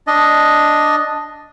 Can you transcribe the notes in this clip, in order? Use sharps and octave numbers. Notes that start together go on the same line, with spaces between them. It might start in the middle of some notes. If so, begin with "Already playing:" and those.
D4 D#5